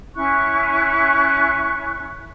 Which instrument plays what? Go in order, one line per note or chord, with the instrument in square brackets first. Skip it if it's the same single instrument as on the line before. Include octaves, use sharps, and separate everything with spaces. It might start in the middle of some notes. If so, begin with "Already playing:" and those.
[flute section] C#4 E4 C#6 F#6